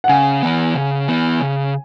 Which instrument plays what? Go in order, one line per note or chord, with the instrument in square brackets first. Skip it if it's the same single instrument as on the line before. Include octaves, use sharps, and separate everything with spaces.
[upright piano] F#5
[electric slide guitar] C#3 [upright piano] G#5
[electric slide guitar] E3 B3
C#3
E3 B3
C#3